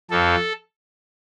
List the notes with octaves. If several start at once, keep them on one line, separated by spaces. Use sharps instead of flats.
F2 F3 A4